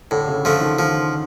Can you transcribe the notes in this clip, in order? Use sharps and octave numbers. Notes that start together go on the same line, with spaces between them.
A2 D3
C#3
D3 F3 A3
D#3
D#3 F3